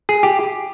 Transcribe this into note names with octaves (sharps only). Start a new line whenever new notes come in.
G#4
G4